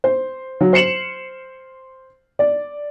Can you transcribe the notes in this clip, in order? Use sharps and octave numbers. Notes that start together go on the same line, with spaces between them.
C5
F#3
C5 C7 C#7 E7 F#7
D5